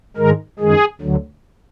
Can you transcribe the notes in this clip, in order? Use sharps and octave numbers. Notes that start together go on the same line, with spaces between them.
G#2 D#3 G#3 A#4
F#2 D#3 G#3 G#4
D2 D3 F#3